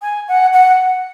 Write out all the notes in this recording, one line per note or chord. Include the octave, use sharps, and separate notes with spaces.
G#5
F#5
F#5